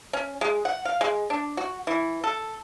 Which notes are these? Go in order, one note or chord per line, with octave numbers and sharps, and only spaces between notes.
C#4
G#3
F#5
F5
G#3
D4
F#4
E3
A4